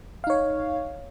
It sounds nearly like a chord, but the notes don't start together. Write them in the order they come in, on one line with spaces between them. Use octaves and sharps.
F5 D#4 C#5